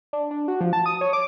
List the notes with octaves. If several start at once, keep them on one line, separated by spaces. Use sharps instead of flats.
D4
D4
F#4
F3
A5
D#6
C#5
D6